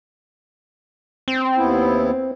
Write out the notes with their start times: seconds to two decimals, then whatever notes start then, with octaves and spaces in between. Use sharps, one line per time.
1.28 C4
1.57 D#2 B3 E4